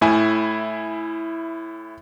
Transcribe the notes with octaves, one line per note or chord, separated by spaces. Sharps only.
A2 E4 G#5